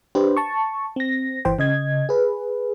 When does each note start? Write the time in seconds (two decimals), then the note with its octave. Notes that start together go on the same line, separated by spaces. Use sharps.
0.15 D4 G4 B4 C5
0.37 A5 C#6
0.96 C4 A#6
1.45 G1 E3 C5 G5
1.59 C#3 D#5 G#6
2.09 G#4 B4